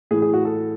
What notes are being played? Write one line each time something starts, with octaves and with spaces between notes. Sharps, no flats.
A2 E3 G#4
G#4
F#4
A4